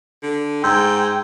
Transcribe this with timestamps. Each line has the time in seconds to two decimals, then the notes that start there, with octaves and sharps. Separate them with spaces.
0.23 D3
0.64 G#2 G5 C6 E6 G6